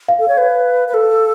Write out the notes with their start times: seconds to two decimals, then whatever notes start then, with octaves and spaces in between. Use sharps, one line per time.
0.08 F5
0.19 A4
0.28 C#5
0.37 B4
0.88 B4
0.94 A4